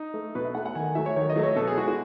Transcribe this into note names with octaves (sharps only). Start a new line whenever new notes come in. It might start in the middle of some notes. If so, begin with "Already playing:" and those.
Already playing: D#4
A3
B2 B4
E5
A3 F#5
F#5
D#3 G#5
G#5
F#3 A3 E5
C#5
D#3 C#5
D#5
F#3 A3
C#5
B2 A4
G#4
G#3 F#4
F#4